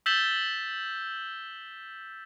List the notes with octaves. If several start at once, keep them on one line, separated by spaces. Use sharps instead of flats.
E6 G6 A6 B6 E7 G7